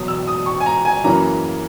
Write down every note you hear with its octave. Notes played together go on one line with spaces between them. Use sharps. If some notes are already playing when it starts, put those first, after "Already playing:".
Already playing: E2 B2 F#3 D#6
E6
D#6
C#6
G#5
A#5
G#5
F#2 C#3 E3 A#3 C#4 A#5